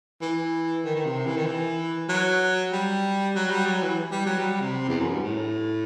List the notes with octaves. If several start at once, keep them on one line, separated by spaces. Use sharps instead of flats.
E3
D#3
D#3
C3
E3
D#3
E3
F#3
G3
F#3
G3
F#3
E3
G3
F#3
G3
C3
E2
F#2
G2
A2